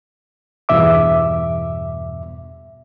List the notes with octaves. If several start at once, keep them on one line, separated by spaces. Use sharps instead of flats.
E2 G2 B2 E5 D6